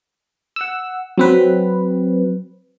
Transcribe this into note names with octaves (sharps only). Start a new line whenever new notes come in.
F#5 E6
F#3 C4 B4